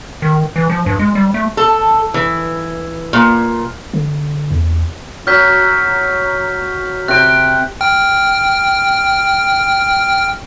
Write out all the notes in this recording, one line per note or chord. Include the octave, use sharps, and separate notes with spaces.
D#3
E3
F3
G2
G#3
G3
A3
A4
E3
A#2
D3
E2
F#3 F6 G6 B6
C3 G5 F#6
G5 F6